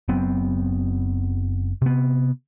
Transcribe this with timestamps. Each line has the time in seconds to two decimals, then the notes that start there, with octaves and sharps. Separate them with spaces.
0.08 F#1 F#3 B3 C4
1.82 C3 B3